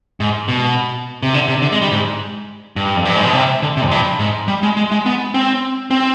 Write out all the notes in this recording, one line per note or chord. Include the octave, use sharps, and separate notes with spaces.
G#2
B2
C3
D3
C3
D3
G#3
G3
G#2
G2
F2
G2
G#2
B2
C3
D3
C3
F2
G2
G#2
G3
G#3
G#3
G#3
B3
C4
C4